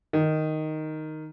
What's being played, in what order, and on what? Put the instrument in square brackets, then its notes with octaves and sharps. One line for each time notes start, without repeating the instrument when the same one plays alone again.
[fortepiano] D#3